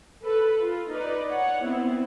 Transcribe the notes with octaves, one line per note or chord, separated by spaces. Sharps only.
A4 B4
F4
D#4 B4 D5
C#5 F#5
B3 C4 E4